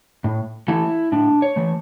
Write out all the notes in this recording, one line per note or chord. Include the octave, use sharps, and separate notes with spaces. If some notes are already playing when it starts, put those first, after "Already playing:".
A2
E3 A3 E4
A2 D4
C#5
E3 A3